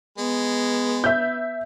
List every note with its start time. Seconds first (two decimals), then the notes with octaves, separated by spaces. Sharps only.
0.18 G#3 B3
1.04 E5 G6